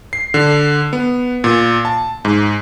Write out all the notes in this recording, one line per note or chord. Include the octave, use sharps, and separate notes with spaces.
C7
D3
B3
A#2
A5
G#2